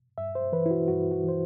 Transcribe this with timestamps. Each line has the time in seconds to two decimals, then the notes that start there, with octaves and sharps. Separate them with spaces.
0.18 G2 E5
0.35 C5
0.52 E3 B4
0.66 E4
0.71 F#4
0.88 G2 F#4
1.11 F#4
1.24 E3 C5